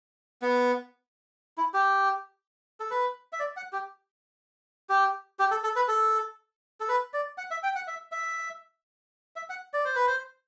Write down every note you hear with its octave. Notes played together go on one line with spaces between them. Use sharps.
B3
E4
G4
A4
B4
E5
D5
F#5
G4
G4
G4
A4
A4
B4
A4
A4
B4
D5
F#5
E5
G5
F#5
E5
E5
E5
F#5
D5
C5
B4
C5